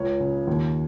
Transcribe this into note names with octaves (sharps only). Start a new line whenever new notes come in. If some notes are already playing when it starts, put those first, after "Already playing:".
Already playing: C#2 C#5
C#3
D#2